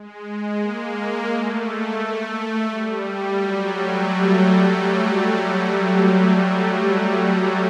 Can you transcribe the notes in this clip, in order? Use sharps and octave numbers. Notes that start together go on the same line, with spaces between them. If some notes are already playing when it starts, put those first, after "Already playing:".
Already playing: G#3
A#3
A3
G3
F#3
A3